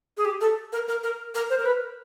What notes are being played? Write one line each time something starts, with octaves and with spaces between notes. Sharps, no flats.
G#4
G4
A4
A#4
A#4
A#4
A#4
C5
A#4
B4